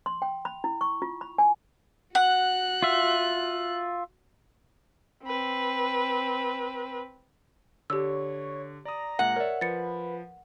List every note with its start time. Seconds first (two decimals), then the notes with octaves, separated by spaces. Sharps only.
0.06 C6
0.22 G5
0.45 B5
0.64 E4
0.81 C#6
1.02 F4
1.21 B5
1.38 G#5
2.15 F#4 F#5 F#6
2.82 F4 E5
5.23 C4 B4
7.90 D3 G4 C#5 E6
8.85 D5 A#5 D#6
9.19 A#2 G#3 F#5
9.36 A#4 C#5 D5 E5
9.61 F3 B4 A6 C#7